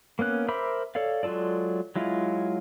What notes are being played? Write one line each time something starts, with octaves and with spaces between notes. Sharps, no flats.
A#3 B3 C#4 F#6
A#4 C5 E5 B5 D6
A4 C#5 D5 F5
F#3 G#3 F4 A4 D5
F#3 G#3 E4 F4